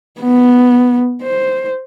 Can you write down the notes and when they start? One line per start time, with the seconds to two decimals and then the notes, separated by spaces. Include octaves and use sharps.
0.20 B3
1.23 C5